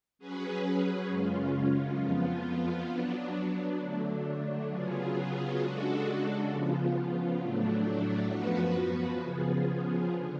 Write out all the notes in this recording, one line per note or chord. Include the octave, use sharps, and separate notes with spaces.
F#3 C#4 G#4 B4
F#2 C#3 G#3 C#4 F4
F2 F3 B3 F4
F#3 B3 D4
D3 F#3 A3 D4
C#3 F#3 B3 F4 G#4
C#3 G#3 D4 F#4 A4
C#3 F3 B3 F4
A2 F#3 A3 D4
F#2 F3 B3 F#4 B4
C#3 F3 B3 F4 G#4
D3